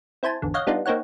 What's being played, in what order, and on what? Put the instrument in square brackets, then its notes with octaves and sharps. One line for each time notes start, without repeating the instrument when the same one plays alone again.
[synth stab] C4 E4 C5 G#5 A5
G#1 E2 D3
C#5 D#5 F5 F#5 G6 A#6
G3 B3 D4 D#4 F4
A#3 C4 D#4 C#5 F#5